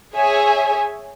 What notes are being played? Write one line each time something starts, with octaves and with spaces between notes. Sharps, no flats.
G#4 C#5 E5 G#5